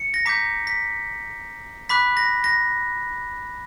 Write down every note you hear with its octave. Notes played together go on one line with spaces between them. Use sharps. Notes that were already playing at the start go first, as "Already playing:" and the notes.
Already playing: C#7
A#6
A#5 D6 G6 B6
B6
B5 D6 F#6 B6
A#6
A#6